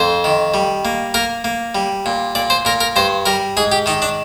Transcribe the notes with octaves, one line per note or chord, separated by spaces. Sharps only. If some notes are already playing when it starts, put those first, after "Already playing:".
Already playing: F2 C5
D#3
G3
A#3
A#3 A#4
A#3
G3
A#2
A#2 D5
C5
A#2 A#4
A#4
G2 C5
G3 A#4
G#2 G#4
G4
D#3 D#4
D4